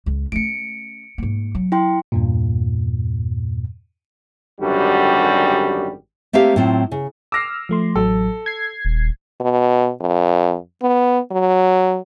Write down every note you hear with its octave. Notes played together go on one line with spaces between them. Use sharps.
C#2
A3 C#4 C#7 D7
G#2 A#3
F#3
E4 G5 C6
E2 G2 A#2
G#1 F#2 D3 G3 F#4 G4
A3 A#3 C4 G4 F5
A2 F#3 C4 F4
C#3
D6 E6 F6 A#6 C7
F3 A3 C6
A1 F#3 A4
G#6 C7
D#1
B2
F2
B3
F#3